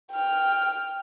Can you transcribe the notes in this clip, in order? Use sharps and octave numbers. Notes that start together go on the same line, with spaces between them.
G5 F6